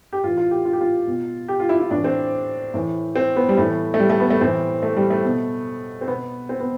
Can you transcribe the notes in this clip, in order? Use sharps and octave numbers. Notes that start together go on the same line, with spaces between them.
G4
A2 E3 F4
F4
G4
F4
G4
F4
B2
G4
F4
E4
E4
A2 E3 D4
C4
A2 E3
C4
B3
G3
A2 E3 A3
A3
G3
A3
B3
A3
A2 E3 C4
A3
G3
A3
B2
C4
B2 B3
C4
B3